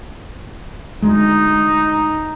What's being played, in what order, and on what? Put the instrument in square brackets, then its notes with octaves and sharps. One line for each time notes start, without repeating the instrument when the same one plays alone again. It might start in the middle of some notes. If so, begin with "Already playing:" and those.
[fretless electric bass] D2 G#3 [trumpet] D#4